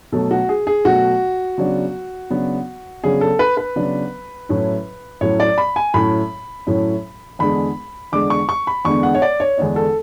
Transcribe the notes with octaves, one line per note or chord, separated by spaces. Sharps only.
B2 F#3 A3 A4
F#4
G#4
G#4
B2 F#3 A3 F#4
C#3 F#3 B3 D4
C#3 F#3 B3 D4
C#3 F#3 B3 D4 G#4
A4
B4
B4
C#3 F#3 B3 D4
A2 F#3 C#4 E4
A2 F#3 C#4 E4 C#5
D5
B5
G#5
A2 F#3 C#4 E4 B5
A2 F#3 C#4 E4
E2 D3 G#3 B3 D4 B5
E2 D3 G#3 B3 D4 D6
C#6
C#6
B5
E2 D3 G#3 B3 D4 C#6
F#5
C#5
D5
C#5
E2 D3 G#3 B3 D4
A4